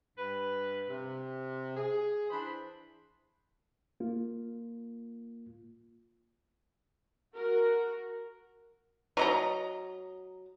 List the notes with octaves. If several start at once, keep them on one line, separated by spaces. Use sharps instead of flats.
G2 B4
C3
G#4
E3 D4 C5 B5
A#3 F4
F#4 A#4
F#3 D#5 A#5